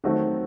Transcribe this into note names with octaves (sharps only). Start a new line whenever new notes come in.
D#3 F#3 A3 C4 F#4